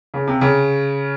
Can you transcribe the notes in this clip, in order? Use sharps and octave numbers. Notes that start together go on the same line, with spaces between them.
C#3
C3
C#3